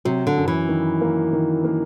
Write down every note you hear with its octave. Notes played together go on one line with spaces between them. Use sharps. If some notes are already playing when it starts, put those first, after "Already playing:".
C3 F#3
D3
F#2
E3
D#3
A#3
D#3
A#3